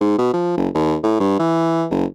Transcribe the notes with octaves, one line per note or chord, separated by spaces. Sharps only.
G#2
B2
F3
F#1
D#2
A2
G2
E3
F#1